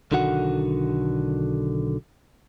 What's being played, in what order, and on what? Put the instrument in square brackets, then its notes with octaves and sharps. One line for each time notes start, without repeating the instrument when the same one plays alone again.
[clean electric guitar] B1 D3 D#3 F#4 F#5